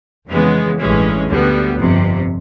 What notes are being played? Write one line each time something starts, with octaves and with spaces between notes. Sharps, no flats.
F2 C#3 E3 G#3 B3
A1 G2 E3 G#3 C#4
D2 D3 G3 B3
G1 F2 C3